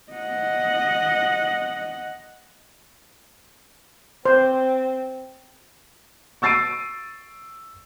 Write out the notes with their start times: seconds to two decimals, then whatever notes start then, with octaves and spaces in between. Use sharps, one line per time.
0.12 D#5 F#5
4.26 C4 C5
6.42 C#6 E6 A6 C7 D7 D#7